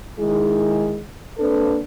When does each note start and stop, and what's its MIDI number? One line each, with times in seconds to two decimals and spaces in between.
0.19 1.00 51
0.19 1.00 56
0.19 1.00 63
0.19 1.00 64
0.19 1.00 68
1.38 1.79 58
1.38 1.79 60
1.38 1.79 62
1.38 1.79 69
1.38 1.79 71